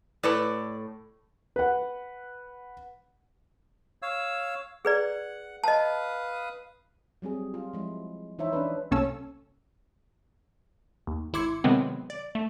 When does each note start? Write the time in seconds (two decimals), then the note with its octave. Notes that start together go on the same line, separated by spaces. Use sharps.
0.23 A2 A4 B4 D5
1.56 B4 F#5
4.02 C#5 F5 E6
4.85 G#4 B4 D5 F#5
5.64 B4 D#5 F5 A5 D#6
7.22 F#3 G3 C4 G#4
7.54 F4
7.73 F3 G#3 E4
8.39 E3 D#4 E4 C5 C#5 E5
8.53 E3 C#4 D4 B4
8.91 C2 C3 A#3 C#4 A4 E6
11.07 D#2
11.33 G#1 E4 C6 D6 G#6 C#7
11.64 C3 D#3 F#3 G#3 B3 C4
12.10 D5
12.35 A3